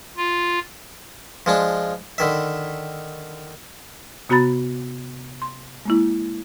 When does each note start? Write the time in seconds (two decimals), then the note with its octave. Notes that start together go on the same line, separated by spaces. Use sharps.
0.17 F4
1.46 F3 G#3 D4
2.18 D3 D#3 E5
4.29 C3 B3 F#4 A#5 B5 A6
5.42 C6
5.85 G#3 A#3 E4